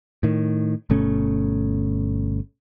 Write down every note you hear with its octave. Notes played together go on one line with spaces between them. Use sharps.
A2 D#3
G1 B2 A3 C#4